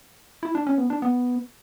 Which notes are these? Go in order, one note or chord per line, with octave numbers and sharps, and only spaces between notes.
E4
D4
C#4
B3
D4
B3